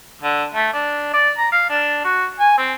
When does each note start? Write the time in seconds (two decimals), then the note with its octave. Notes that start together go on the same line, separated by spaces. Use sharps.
0.22 D3
0.54 A3
0.73 D4
1.13 D5
1.38 A#5
1.52 F5
1.69 D4
2.04 F#4
2.39 G#5
2.58 C4